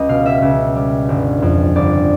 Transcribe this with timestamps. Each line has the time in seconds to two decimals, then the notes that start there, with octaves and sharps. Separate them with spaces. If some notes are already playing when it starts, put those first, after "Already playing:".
Already playing: C#2 D#5
0.09 B2 F5
0.26 E5
0.42 C#2
0.76 G3
1.09 G1
1.42 F2
1.75 G1 D5